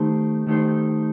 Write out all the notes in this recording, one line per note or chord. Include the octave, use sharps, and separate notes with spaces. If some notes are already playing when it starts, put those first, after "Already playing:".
Already playing: D#3 A3 D#4 G4 C5
D#3 A3 D#4 G4 C5